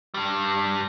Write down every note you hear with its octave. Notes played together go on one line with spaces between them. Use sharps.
G2 G3